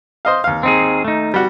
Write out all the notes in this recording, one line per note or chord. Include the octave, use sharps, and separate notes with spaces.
C5 D#5 F5
D#2 F5
C4 D#4 G#4
A3 D#4
G3 F#4